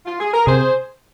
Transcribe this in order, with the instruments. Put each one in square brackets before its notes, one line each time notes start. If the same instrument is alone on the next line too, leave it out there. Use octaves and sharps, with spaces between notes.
[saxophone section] F4
G#4
A#4
[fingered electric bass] C3 [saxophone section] G#4 C5